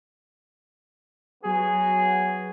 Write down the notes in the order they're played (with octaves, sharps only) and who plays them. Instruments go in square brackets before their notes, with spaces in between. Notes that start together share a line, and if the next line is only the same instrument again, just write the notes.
[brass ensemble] F#3 B3 F#4 [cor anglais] G#4